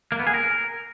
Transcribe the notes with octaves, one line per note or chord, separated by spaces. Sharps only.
A#3
B3
G#4
A#4